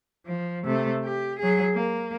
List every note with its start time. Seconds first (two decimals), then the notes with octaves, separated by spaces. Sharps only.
0.26 F3
0.65 C3 A3
1.04 G4
1.39 F#3 G#4
1.74 A#3